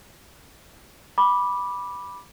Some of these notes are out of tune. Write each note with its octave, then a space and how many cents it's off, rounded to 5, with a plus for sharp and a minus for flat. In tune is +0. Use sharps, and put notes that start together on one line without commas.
B5 -10 D6 +0